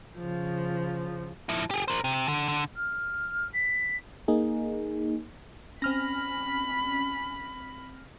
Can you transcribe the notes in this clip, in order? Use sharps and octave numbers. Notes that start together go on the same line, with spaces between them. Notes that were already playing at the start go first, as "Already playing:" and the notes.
C#3 F3
F3 E4
G4 G#4
A#4 C5
C3
D3
D3
F6
B6
A#3 D#4 G#4
C4 C#4 B5 F6 A#6